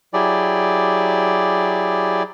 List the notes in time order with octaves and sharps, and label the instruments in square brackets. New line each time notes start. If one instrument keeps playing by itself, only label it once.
[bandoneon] F#3 E4 G4 G#4 D5